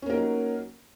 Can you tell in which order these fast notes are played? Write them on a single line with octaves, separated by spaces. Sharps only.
C#4 A#3 A#4 D#4 F#3